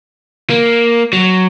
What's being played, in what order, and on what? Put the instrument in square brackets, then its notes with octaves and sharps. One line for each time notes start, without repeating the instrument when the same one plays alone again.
[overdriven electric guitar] A#3
F#3